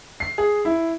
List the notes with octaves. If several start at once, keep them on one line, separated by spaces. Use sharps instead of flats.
C7
G#4
E4